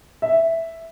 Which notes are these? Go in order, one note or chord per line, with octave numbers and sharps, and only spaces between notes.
E5